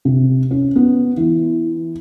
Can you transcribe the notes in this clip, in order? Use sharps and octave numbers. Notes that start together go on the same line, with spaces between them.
C3
C#4
B3
E3